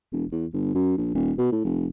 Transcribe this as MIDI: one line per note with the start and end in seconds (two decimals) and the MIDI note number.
0.12 0.25 28
0.32 0.46 40
0.53 0.72 31
0.75 0.95 42
0.98 1.12 34
1.14 1.32 27
1.38 1.50 47
1.52 1.61 45
1.64 1.86 29